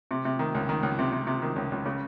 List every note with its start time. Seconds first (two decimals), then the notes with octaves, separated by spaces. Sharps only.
0.11 C3
0.25 C3
0.39 D#3
0.55 C#2
0.69 D#3
0.83 C#2
0.99 C3
1.12 C3
1.27 C3
1.42 D#3
1.56 C#2
1.72 C#2
1.86 C#3